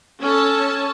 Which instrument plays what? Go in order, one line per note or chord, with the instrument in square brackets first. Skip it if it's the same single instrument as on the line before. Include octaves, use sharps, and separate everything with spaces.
[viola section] C#4 A4 A5